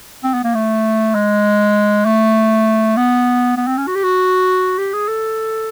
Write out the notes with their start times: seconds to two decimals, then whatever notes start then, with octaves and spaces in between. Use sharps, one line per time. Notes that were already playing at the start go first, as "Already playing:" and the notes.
0.24 C4
0.34 B3
0.44 A#3
0.55 A3
1.15 G#3
2.05 A3
2.97 B3
3.57 B3
3.67 C4
3.78 C#4
3.87 F#4
3.95 G4
4.04 F#4
4.78 G4
4.93 G#4
5.08 A4